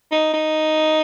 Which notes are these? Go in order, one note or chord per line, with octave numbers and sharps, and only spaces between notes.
D#4
D#4